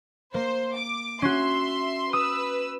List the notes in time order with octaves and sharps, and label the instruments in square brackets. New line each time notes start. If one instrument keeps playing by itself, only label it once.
[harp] A#3 [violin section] C5
[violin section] D6
[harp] C#4 F#4 [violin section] E5 C6
[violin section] B4 E6 [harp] D#6